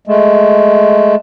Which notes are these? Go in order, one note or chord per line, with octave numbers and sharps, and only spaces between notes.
G#3 A3